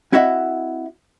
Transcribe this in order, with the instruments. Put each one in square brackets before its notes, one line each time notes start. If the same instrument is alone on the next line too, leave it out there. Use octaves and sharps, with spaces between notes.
[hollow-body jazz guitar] C4 E4 F#4 D#5 E5 F#5